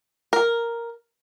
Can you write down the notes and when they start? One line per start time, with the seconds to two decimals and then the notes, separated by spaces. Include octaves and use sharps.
0.33 A#4